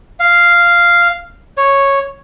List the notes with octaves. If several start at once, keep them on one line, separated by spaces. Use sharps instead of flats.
F5
C#5